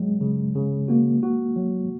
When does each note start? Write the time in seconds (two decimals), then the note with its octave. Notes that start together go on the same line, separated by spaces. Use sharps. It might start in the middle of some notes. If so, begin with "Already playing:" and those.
Already playing: F#3 G#3
0.21 C#3
0.56 C#3
0.88 A#3 F#4
1.23 F#4
1.56 F#3